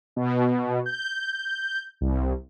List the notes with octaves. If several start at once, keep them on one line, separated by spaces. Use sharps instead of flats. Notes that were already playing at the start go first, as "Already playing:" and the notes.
B2
G6
C2